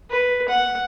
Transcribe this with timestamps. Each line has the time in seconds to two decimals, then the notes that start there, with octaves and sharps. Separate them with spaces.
0.10 B4
0.49 F#5